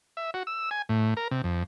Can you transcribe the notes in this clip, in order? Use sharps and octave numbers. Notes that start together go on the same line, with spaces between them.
E5
F#4
E6
G#5
A2
A#4
C3
F2